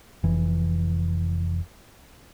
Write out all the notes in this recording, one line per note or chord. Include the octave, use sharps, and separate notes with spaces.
F1 E3